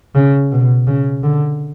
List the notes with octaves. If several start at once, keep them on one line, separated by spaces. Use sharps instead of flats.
C#3
B2
C#3
D3